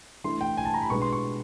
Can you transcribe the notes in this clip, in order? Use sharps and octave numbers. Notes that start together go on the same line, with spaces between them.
E3 A3 D4 C6
G5
G#5
A5
A#5
B5
B2 G#3 B3 D4 C#6
C6
C#6